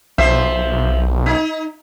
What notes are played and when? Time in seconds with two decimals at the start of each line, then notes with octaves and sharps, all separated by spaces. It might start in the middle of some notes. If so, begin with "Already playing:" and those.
0.18 B1 F3 C5 E5
1.26 D#4